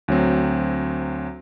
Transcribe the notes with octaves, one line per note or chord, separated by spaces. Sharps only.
D2 F#3 C4